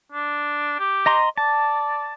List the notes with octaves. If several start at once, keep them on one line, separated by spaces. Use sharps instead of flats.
D4
G4
D#5 A#5 C6
D5 A5